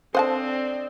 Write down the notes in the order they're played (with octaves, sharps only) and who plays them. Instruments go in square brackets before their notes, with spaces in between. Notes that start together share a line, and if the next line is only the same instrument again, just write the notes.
[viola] C4 [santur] D4 A4 D#5 [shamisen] C5 F#5 A5